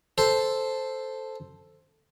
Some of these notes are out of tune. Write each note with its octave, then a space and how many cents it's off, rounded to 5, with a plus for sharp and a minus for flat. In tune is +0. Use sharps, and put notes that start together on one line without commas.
A4 +0 C5 +0